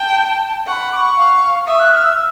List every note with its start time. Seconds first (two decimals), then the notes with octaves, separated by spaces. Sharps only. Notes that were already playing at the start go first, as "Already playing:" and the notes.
Already playing: G5 A5
0.67 F#5 C#6
0.72 B5
0.92 D6
0.96 C#6
1.17 F5
1.67 E5 D#6
1.79 F#6
1.92 F6
2.04 E6